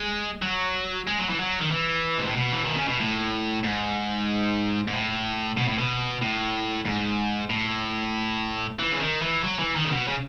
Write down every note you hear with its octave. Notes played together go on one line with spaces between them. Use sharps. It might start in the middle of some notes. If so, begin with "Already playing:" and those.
Already playing: G#3
F#3
G#3
F#3
E3
F#3
D#3
E3
G#2
A2
B2
E3
D#3
C#3
B2
A2
G#2
G#2
A2
B2
A2
B2
A2
G#2
A2
E3
C#3
D#3
E3
F#3
E3
D#3
C#3
B2
C#3